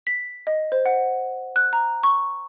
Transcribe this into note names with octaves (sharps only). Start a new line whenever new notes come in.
B6
D#5
C5
F#5
F#6
A#5
C#6